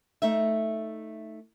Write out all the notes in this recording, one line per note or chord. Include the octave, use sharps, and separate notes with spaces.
A3 D#4 E5